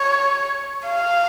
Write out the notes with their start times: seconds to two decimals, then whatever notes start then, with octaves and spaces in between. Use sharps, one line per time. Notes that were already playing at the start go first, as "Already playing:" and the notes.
Already playing: C#5
0.88 F5